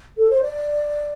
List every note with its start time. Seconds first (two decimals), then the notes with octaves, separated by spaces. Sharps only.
0.17 A4
0.30 C5
0.42 D5